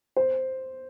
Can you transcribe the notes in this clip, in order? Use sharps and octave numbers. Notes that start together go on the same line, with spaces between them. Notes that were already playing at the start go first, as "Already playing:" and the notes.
C5